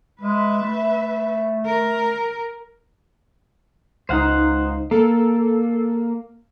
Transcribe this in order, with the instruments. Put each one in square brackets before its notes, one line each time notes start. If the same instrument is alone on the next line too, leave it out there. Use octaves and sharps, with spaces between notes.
[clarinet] G#3 [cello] B4 E5
[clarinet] A3
[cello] A#4
[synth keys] C#2 D#4 [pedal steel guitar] C5 F5 F#5
[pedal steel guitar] A#3 [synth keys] A4